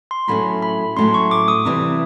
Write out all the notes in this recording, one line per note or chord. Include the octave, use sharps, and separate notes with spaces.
C6
A2 F#3 A3 C#4 B5
B5
A2 F#3 A3 C#4 C6
C#6
D6
D#6
C3 E3 G3 C4